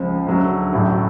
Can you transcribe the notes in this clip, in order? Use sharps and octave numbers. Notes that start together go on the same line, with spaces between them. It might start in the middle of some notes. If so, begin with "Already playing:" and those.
Already playing: C#2 C#3 F3
D2 D3 F#3 A3
A1 A2 F#3 A3